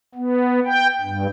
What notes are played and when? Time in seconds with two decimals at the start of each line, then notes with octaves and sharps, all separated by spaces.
0.15 B3
0.65 G5
1.01 G2